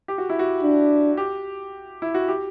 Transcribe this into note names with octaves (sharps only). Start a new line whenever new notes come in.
G4
F#4
E4
F#4
D4
G4
E4
F#4
G4